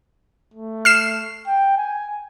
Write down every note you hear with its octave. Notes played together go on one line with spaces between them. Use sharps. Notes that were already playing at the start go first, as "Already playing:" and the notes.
A3
F6 C7 E7
G5
G#5